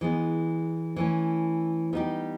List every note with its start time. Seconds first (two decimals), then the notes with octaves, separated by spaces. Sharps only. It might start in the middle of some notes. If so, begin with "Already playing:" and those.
0.01 E3 G#3 B3
0.96 E3 A3 C#4
1.93 G3 B3 D#4 G4